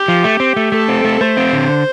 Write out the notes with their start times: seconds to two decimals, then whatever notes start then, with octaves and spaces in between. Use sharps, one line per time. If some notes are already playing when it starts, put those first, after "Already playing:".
Already playing: G4
0.08 F3
0.24 A3
0.40 C4
0.57 A3
0.72 A3 A4
0.88 C4
1.05 A3
1.21 A3 C5
1.37 C4
1.53 D3